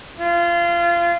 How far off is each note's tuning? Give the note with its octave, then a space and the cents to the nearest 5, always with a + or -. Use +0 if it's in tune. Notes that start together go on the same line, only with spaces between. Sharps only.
F4 -25